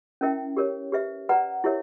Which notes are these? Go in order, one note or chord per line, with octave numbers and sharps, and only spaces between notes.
C#4 E4 A#4 E5 G5
G4 A#4 C#5
G4 B4 E5
B4 D5 F#5 A#5
E4 G4 A#4 C#5 E5